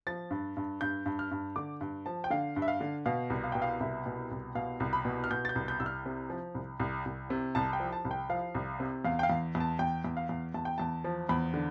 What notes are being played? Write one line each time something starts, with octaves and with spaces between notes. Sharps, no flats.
F3 A6
G2
G2
G2 G6
G2
F6
G2
D3 D6
G2
F3 A5
G5
D3 F5
G2
E5
F5
D3
B2 F5
C2
F5
B2 G5
F5
C2 E5
B2
C2
B2 F5
C2
B5
B2
F6
B2 G6
A6
G6
C2
G6
C2 E6
F6
C3
F3
C2
C2
C2
C3
C2 A5
G5
F3
A5
C2
G5
F3 F5
C2
C3
E2 F5
G5
F5
E2
E2
A5
E2 G5
E2
F5
E2
E2 A5
G5
E2 A5
F3
E2 B5
D3